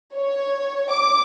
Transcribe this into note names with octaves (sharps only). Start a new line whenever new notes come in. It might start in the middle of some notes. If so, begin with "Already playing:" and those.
C#5
D6